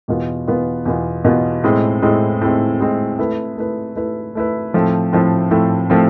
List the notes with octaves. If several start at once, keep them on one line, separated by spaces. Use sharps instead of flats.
E2 B2 B3 F4
E2 B2 B3 F4
E2 B2 B3 F4
E2 B2 B3 F4
A2 G#3 C4
A2 G#3 C4
A2 G#3 C4
A2 G#3 C4
A3 E4 B4
A3 E4 B4
A3 E4 B4
A3 E4 B4
A2 F3 A3 C4
A2 F3 A3 C4
A2 F3 A3 C4
A2 F3 A3 C4